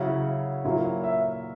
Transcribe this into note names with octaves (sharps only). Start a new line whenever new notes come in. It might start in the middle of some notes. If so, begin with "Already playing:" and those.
Already playing: C#3 F#3 C#4 E4 F#5
A#2 F#3 A#3 E4
E5